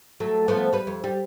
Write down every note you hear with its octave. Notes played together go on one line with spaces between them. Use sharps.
F#3 A3
F3 A3 B3
G3 B4
F2
G3